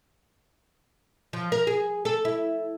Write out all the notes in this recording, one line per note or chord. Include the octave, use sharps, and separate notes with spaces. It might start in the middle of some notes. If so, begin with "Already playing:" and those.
F3
A#4
G#4
A4
E4